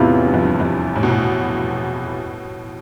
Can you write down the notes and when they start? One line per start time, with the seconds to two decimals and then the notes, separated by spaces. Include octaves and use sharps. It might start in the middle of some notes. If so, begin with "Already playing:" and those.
Already playing: E2 A2 C3 E3 B3 F4
0.25 G2
0.34 F2
0.43 G2
0.60 F2
0.95 A2
1.03 B2
1.10 A2